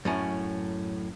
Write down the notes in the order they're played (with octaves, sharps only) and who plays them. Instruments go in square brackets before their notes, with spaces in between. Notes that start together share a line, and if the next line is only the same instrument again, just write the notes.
[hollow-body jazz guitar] F#2 A2 C#4